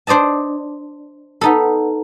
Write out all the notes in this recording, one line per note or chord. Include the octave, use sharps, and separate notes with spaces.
D4 C5 D5 D#5 A5
B3 D#4 A4